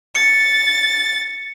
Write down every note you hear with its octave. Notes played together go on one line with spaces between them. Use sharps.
A6 C#7